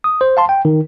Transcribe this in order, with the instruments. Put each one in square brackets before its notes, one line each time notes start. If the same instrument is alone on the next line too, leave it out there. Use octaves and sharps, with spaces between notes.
[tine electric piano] D#6
C5
F5 A5 C6
G5
D#3